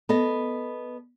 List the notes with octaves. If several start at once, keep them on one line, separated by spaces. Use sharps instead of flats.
B3 A4 D#5